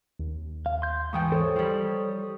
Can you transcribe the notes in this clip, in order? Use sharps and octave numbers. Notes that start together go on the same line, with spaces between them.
D#2
F5
C6 G6
G#2 E3 G5 C#6 D#6
A4 C5 C#5
F3 G3